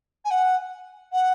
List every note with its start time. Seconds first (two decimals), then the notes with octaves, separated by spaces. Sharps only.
0.24 G#5
0.30 F#5
1.12 F#5